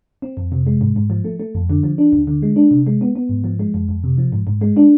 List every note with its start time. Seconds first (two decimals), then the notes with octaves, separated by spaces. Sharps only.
0.22 C4
0.37 F2
0.52 C3
0.67 G#3
0.81 G#2
0.96 G#2
1.10 F3
1.24 A3
1.40 A3
1.55 F2
1.70 D3
1.83 F3
1.98 D4
2.13 D2
2.27 D3
2.42 G#3
2.56 D4
2.71 C3
2.87 G#3
3.01 B3
3.16 B3
3.29 G#2
3.44 F3
3.59 G#3
3.74 F2
3.89 F2
4.04 C3
4.18 F3
4.32 G#2
4.47 G#2
4.61 G#3
4.77 D4